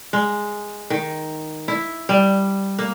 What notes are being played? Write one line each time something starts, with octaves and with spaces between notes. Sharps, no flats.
G#3
D#3
E4
G3
A#3